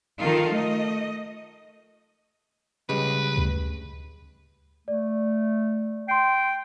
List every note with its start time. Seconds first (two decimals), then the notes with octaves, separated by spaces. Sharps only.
0.23 D#3 D#4 F4 A4 A#4
0.52 A3 D#5
2.89 C#3 G3 G#3 B4
3.37 D2
4.88 A3 D5
6.08 G5 C6 C7